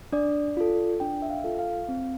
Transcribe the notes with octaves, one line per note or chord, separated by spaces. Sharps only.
D4 D5
F4 A4
D4 G5
E5
F5
F4 A4
F5
C4